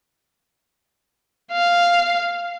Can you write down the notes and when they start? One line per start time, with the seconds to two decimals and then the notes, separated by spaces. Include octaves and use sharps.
1.52 F5